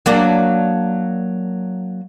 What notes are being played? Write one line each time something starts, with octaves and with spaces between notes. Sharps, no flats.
F#3 A#3 D4